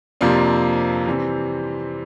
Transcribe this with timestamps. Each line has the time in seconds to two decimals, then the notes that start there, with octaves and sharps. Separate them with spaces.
0.21 F2 C3 F3 A#3 D4
1.06 C3 E3 G3 C4